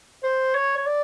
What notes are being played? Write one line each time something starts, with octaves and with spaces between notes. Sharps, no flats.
C5
C#5
C#5
D5